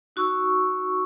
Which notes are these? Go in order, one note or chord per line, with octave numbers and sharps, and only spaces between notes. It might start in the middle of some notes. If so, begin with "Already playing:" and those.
D#4 F#4 C#6 E6